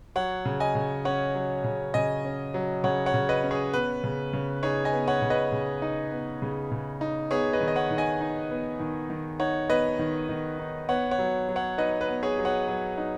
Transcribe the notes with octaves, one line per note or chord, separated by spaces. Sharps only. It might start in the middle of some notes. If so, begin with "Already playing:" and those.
F#3 C#5 F#5
C#3
D#5 G#5
C#3
C#4 C#5 F#5
F#3
C#3
C#3 D#5 G#5
C#4
F#3
C#3 C#5 F#5
C#5 F#5
C#3
B4 D#5
C#4
G#4 C#5
B3 B4
C#3
C#3
D#4 G#4 C#5
D#5 G#5
B3
C#5 F#5
C#3
B4 D#5
C#3
D#4
B3
C#3
C#3
D#4
B3 G#4 C#5
B4 D#5
D#3
D#5
C#5 F#5
D#3
D#5 G#5
D#4
B3
D#3
D#3
D#4 C#5 F#5
B3 B4 D#5
D#3
D#3
D#4
B3 C#5 F#5
C#5 F#5
F#3
F#3
C#5 F#5
D#4 B4 D#5
B4
B3
G#4 C#5
F#3
C#5 F#5
F#3
D#4